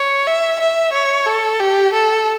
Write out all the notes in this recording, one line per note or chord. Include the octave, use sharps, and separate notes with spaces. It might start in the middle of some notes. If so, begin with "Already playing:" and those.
Already playing: C#5
E5
E5
C#5
A4
G4
A4